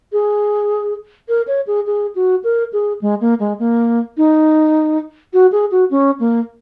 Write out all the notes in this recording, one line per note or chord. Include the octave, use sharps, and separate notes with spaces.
G#4
A#4
C#5
G#4
G#4
F#4
A#4
G#4
G#3
A#3
G#3
A#3
D#4
F#4
G#4
F#4
C#4
A#3